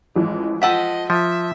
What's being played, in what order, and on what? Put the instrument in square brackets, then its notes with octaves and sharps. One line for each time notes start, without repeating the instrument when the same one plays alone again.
[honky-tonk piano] A1 E3 F3 [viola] G#3
[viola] F3 D#5 [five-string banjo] A4 F#5 G5 [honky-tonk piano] B6 D#7
[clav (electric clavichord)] F3 [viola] E5